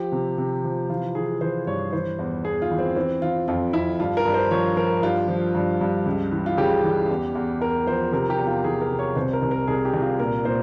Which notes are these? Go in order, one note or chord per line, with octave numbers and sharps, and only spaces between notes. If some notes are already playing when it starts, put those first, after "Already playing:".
Already playing: F3 G4
C3
C3
F3
E3 F4
E3 G#4
E3 C5
G2 C#5
E3 C5
E2
E2 G#4
F4
E3
C4
E3 C4
E3 F4
F2 F4
F2 E4
G2 F4
A#4
G2
C5
F3 C#5
F3 A#4
G2 F4
F3
G2
G2
C#2
E3
F4
C#3 G4
E3
E2
E2
E2 A#4
F3 C5
C3 A#4
G4
E2
F4
E3 G#4
A#4
C3
C#5
C2 C5
A#4
C2
A#4
C2 G#4
G4
C2
F4
A#2 A#4
A#2 C5